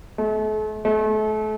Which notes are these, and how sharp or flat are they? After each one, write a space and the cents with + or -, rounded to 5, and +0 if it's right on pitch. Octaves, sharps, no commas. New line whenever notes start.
A3 -40
A3 -35